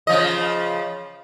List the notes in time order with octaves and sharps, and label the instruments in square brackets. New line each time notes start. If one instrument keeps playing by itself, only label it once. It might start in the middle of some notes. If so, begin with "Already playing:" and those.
[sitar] C#3 F3 D#5